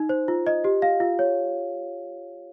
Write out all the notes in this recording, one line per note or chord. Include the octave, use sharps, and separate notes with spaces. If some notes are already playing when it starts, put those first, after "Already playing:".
Already playing: D#4
C5
F4
D#5
G4
F5
F4
C#5